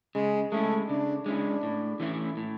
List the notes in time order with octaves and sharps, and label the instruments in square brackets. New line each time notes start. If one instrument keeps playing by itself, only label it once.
[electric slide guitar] C#3 [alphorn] G#3
[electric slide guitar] G#3 C#4 E4 [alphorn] A3
[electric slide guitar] C#3 [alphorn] D4
[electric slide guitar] G#3 C#4 E4 [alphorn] D4
[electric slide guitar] A2
E3 A3 C#4 E4
A2